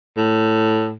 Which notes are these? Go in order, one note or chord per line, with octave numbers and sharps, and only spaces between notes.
A2